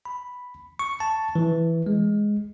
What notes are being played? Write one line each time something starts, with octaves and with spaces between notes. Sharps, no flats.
B5
C#6
A5
E3
G#3